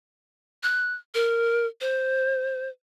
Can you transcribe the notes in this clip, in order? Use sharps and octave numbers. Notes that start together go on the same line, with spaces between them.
F#6
A#4
C5